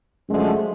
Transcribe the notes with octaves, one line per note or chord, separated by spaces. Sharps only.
F#2 D3 F3 G#3 A3